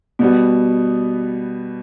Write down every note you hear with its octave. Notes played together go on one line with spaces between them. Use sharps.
B2 G3 B3